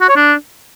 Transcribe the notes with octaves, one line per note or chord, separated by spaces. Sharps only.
F#4
C#5
D4